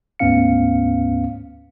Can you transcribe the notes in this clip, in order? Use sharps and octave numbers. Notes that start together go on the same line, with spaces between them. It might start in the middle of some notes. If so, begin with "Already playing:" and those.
D2 G#2 B3 C#4 F5 C#7